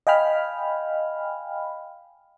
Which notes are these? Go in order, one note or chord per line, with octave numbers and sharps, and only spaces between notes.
D#5 F5 G5 G#5 B5 F6